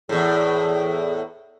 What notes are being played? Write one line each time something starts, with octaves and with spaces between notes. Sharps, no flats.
E2 A2 G#4